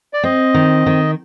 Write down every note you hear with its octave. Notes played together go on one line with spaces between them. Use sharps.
D5
C4 D#5
D#3
D#3